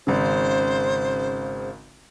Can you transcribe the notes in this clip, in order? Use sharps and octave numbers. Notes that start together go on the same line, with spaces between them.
G#1 C#3 C5